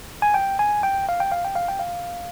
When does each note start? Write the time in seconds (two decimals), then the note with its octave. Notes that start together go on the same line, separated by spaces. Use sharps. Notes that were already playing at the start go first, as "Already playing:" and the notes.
0.22 G#5
0.34 G5
0.59 G#5
0.83 G5
1.09 F5
1.20 G5
1.32 F5
1.45 G5
1.56 F5
1.68 G5
1.79 F5